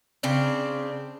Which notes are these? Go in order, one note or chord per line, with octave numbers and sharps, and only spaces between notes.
C#3 C4 D4